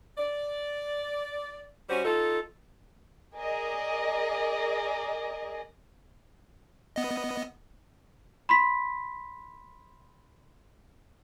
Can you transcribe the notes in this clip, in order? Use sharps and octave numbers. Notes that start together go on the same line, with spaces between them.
D5
G3 C#4 F#4 C5
D#4 F4 A4
G#4 A#4 D5 D#5
B3 D#5
B5 C6 B6